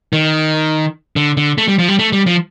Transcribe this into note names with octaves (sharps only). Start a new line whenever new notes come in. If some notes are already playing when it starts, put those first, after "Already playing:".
D#3
D3
D3
A3
G3
F3
G3
A3
G3
F3